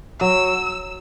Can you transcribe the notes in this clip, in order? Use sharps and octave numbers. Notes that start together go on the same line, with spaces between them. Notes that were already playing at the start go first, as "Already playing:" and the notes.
F#3 E6